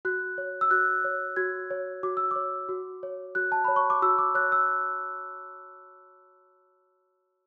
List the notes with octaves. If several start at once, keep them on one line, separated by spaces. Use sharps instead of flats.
F#4 F#6
C#5
E6
F#4 F#6
C#5
F#4 G#6
C#5
F#4 D6
E6
C#5 D6
F#4
C#5
F#4 F#6
A5
C#5 B5
C#6
D6
F#4 E6
D6
C#5 F#6
E6